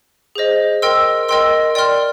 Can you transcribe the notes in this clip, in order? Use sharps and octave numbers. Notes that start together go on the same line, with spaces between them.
G#4 C5 D#5
A#4 D#5 G5 C6 E6
A#4 D#5 G5 C6 E6
D5 G5 C6 F6